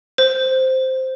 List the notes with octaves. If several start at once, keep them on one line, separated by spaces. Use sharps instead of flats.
C5